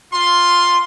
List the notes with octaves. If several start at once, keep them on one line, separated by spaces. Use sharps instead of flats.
F4 C6